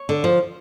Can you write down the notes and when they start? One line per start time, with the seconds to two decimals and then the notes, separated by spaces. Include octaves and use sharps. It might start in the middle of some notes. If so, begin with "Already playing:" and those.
Already playing: C#5
0.09 D3
0.24 F3